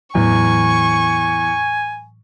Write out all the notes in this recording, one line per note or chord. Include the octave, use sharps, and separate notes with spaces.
E2 A2 E3 F#3 G#5 C#6